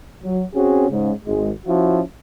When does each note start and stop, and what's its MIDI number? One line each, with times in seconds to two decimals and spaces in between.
0.24 0.43 54
0.55 0.87 60
0.55 0.87 61
0.55 0.87 66
0.55 0.87 68
0.90 1.12 44
0.90 1.12 49
1.25 1.52 32
1.25 1.52 56
1.66 2.00 53
1.66 2.00 61
1.66 2.00 64
1.66 2.00 66